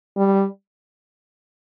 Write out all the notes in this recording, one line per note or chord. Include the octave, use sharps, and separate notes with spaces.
G3